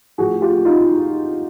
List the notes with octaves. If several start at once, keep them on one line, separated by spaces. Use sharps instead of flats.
A2 F3 F#4 G#4
F4 G4
D#4 F4